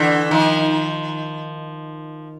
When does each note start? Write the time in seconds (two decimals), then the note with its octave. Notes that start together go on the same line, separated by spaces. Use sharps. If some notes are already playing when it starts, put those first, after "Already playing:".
Already playing: D3 E3
0.31 D#3 F3